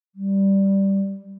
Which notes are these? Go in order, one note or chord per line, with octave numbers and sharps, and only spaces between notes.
G3